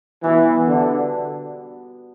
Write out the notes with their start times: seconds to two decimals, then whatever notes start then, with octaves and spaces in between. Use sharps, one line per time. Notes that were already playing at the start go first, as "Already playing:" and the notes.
0.23 B2 E3 G3 B3
0.67 D3